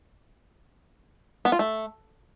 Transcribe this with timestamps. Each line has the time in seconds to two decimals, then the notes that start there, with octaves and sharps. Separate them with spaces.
1.45 B3
1.52 F4
1.59 A3